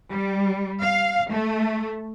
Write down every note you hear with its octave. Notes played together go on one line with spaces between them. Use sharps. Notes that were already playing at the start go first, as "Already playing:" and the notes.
G3
F5
A3